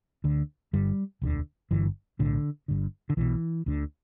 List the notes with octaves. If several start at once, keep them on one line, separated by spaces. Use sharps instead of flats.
D2 D3
G1 G2 D3 G3
E1 D2 D3
G1 G2 D3 E3
B1 A2 D3
G1 G2 D3
D3
B1 B2 E3
D2 D3